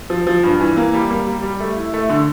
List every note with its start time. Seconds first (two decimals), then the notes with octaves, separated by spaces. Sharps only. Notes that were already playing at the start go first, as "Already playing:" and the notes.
0.10 F3
0.27 F3
0.43 G2
0.60 E3
0.77 A#3
0.94 G3
1.10 A#3
1.27 G3
1.43 G3
1.60 A3
1.76 E4
1.94 A3
2.09 D3